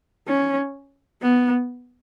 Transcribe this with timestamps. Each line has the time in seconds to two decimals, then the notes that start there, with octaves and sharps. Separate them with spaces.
0.28 C#4
1.22 B3